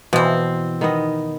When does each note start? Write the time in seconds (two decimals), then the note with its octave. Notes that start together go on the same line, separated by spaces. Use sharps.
0.13 B2 E3 F3 C4
0.81 D#3 B3 D#5